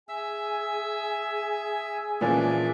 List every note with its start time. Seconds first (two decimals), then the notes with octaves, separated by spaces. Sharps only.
0.09 G#4 E5 G#5 E6
2.21 A#2 E3 F3 A#3 C#4 D4 D5 E5